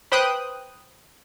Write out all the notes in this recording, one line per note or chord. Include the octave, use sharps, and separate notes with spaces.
B4 C5 G5 D#6 F#6